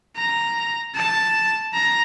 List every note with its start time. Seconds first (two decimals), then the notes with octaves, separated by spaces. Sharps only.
0.17 A#5
0.95 A5
1.74 A#5